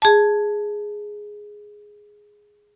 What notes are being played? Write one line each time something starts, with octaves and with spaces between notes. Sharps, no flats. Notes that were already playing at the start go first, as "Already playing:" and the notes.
G#4 A5